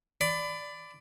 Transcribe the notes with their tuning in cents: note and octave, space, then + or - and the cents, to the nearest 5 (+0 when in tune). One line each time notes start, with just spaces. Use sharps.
D5 +0 B5 +30